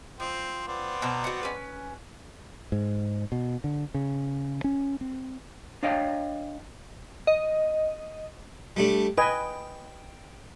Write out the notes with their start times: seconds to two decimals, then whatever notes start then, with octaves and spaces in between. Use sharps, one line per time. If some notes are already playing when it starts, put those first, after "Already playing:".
0.20 F3 C4
0.67 B3 C4 D5
1.02 B2 C5 A#5
1.24 F#4 F#5
1.43 C#4 B4
2.72 G#2
3.32 B2
3.64 D3
3.94 C#3
4.64 C#4
5.01 C4
5.83 D4 C#5 D#5 F5 G5
7.27 D#5
8.77 G3 A3 D4
9.18 B4 D#5 G5 G#5